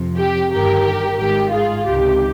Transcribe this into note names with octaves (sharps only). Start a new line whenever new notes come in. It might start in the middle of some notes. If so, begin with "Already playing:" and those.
Already playing: F2 C3 F3
G4
G1 G2 D#3 G4 A#4
G#1 G#2 D#3 G4
F4 G#4
C#2 C3 D#3 G4